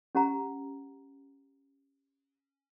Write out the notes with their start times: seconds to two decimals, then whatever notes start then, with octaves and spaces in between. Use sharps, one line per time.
0.15 C#4 G4 F#5 A#5